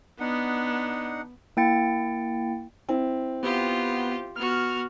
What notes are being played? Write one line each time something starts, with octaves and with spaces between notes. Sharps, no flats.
B3 D4 D#4 F#5
A#3 E4 G5 A6 C#7
C4 E4
B3 F4 G4
B3 F#4 F6